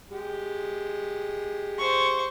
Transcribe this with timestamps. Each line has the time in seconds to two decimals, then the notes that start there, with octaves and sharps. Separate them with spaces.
0.11 G#3 G4
1.78 C5 C#6